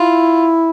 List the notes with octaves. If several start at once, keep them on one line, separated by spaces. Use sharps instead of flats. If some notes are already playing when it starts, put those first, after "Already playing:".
Already playing: E4 F4